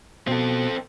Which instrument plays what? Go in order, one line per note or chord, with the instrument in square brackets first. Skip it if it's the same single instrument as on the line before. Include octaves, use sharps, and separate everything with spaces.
[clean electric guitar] B2 [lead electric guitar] C4 A4